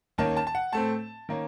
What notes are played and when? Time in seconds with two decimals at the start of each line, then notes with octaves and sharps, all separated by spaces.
0.18 D#2 D#3 A#3 C#4 A5
0.37 A5
0.47 A5
0.55 F#5
0.73 A2 A3 C4 A5
1.29 D#3 A#3 C#4